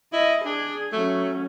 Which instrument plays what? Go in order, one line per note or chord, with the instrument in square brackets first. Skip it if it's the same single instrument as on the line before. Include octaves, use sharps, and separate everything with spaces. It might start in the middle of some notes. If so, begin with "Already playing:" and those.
[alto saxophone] E4 [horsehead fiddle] D#5
[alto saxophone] D4 [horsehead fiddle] G#4
[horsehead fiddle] F#3 C#4 [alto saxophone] A3